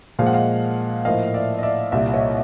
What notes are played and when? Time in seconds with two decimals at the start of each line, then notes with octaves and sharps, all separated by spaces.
0.19 A#2 F3 G#3 F5
0.26 F#5
0.34 D#5 F5
1.05 A2 F3 A#3 D#5 F5
1.34 D5 E5
1.58 D#5
1.63 D5 E5
1.92 C2 A#2 G3 D5 E5
2.14 C#5 D#5